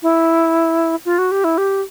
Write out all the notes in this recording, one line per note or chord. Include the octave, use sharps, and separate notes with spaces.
E4
F4
F#4
G4
E4
G4